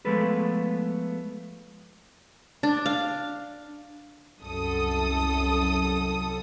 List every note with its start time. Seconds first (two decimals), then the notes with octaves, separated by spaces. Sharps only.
0.05 F3 G#3 A3 B3 A4 B4
2.63 D4
2.86 F5
4.43 C2 F#2 A4 D#6